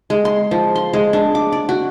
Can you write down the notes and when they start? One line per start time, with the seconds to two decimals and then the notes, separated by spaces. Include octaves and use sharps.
0.10 G#3
0.25 C6
0.51 F3
0.75 C6
0.93 G#3
1.13 D4
1.35 D6
1.52 D5
1.69 F#4